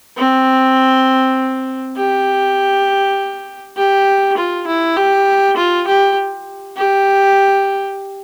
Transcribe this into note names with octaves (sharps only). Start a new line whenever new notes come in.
C4
G4
G4
F4
E4
G4
F4
G4
G4